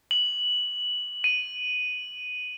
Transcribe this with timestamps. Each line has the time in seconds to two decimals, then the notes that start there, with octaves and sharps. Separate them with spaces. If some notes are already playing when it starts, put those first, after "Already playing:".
0.11 F#7
1.24 D#7